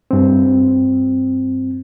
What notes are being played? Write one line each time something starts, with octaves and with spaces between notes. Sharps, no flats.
G2 C4